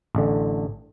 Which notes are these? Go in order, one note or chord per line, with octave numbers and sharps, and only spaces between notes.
A1 D3